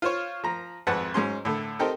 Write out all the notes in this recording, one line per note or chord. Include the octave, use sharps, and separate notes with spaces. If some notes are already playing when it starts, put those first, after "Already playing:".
F4 C5 C#5
F3 A#5
G#1 F2 B4 F#5 A5
G#2 F#3 C#4 C6
A2 D3
C4 D#4 G4 A4 A#4